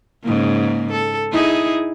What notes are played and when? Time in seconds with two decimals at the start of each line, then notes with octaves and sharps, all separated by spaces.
0.23 G#2 C#3 A#3
0.92 A4
1.32 D#4 E4 G#4